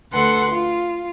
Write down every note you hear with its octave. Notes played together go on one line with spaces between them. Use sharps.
D2 D3 A4 B4 F#5 C6
F4